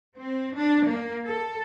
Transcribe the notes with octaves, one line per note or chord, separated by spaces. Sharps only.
C4
D4
A#3
A4